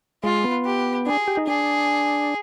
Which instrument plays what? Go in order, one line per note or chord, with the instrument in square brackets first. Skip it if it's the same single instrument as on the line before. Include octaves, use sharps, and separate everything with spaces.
[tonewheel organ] G#3 [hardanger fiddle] F4
[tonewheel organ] B3
[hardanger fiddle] G4
[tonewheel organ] D4 [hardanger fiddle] G#4
[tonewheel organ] G4
D#4
[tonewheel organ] D4 [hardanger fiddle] G#4